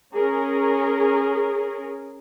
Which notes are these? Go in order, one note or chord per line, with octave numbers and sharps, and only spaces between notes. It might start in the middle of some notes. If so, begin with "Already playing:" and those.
C#4 G#4 A#4